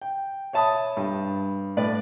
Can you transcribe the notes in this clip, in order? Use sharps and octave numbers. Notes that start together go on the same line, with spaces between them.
G5
C#5 E5 A5 B5 D#6
G2
A2 B4 D5